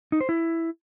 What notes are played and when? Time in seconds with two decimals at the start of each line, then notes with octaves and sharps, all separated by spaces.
0.12 D#4
0.21 C5
0.29 E4